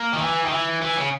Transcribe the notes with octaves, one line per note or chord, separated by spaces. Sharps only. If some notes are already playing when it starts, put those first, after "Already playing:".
Already playing: A#3
D#3
E3
D#3
E3
E3
C#3